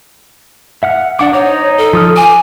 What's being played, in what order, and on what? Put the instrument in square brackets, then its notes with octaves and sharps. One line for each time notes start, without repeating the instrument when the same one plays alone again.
[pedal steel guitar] E5 F#5 F6
[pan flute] D4 [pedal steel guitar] D5 F#5 D6
[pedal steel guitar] D#4 C5 A#5 [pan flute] C#5
[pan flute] A4
[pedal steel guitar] F3 D#6 F6
[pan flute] G#5 [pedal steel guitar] D6